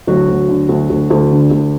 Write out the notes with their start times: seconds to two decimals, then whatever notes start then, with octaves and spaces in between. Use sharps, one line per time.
0.07 D2 F#3 F#4
0.28 D2
0.49 D3
0.69 D2
0.90 D2
1.10 D2
1.31 D3
1.51 D2